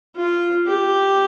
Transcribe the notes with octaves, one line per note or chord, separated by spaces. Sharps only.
F4
G4